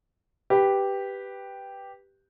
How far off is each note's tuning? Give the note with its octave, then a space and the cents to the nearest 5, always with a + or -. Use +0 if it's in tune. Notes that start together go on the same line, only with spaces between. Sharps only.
G4 +0 B4 +0